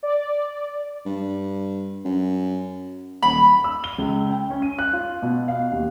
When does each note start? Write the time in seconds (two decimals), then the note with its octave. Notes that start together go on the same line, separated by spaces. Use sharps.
0.03 D5
1.06 G2
2.05 F#2
3.22 D#1 B5
3.64 E6
3.84 G7
3.98 C#2
4.30 G5
4.50 C#4
4.62 D#7
4.79 F#6
4.93 F4
5.22 B2
5.48 F5
5.72 D#2